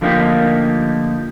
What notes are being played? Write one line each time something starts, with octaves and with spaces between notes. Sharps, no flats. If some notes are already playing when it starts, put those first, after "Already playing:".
D3 F3 A3 A#3 D#4 G4